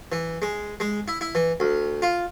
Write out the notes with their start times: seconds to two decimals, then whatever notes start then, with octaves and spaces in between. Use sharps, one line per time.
0.12 E3
0.42 G#3
0.80 G#3
1.08 E4
1.21 E4
1.35 E3
1.60 D2
2.02 F4